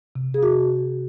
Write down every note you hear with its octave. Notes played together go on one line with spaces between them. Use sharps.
C3
G#4
F#4